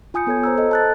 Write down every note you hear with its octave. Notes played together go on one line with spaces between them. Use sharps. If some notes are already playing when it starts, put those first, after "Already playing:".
F4 G#5 D#6 G6 C#7
B3 A4 C#5 G#6
C5 A#5 E6
A4 D#5
A5 F#6 A6